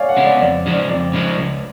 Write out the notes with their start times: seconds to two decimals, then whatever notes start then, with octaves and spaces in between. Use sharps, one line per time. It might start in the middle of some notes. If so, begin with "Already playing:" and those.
Already playing: C#5 D5 F5 G#5
0.09 F#5
0.17 C#3 G#3 B3
0.25 D5
0.41 F2 D5
0.66 C#3 F3 G#3
0.73 D5
0.89 F2 D5
1.14 C#3 F3 G#3
1.38 C#2